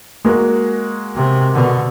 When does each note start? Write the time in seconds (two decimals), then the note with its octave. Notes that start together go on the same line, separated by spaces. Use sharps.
0.25 G#3 A#3 F#4
1.16 C3
1.54 B2 D3